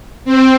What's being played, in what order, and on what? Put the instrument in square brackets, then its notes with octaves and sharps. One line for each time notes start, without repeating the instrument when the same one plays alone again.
[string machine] C4